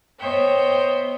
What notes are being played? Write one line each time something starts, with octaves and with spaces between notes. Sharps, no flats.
B3 C5 C#5 D#5 E5 G5